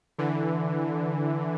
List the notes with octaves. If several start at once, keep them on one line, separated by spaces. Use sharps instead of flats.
D3 E3